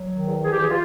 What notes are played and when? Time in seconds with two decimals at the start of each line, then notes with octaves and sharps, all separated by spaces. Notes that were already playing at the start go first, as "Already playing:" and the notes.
Already playing: F#3
0.10 D#3
0.27 E2
0.43 E3 G#4
0.52 G4
0.60 E3 G#4
0.69 F4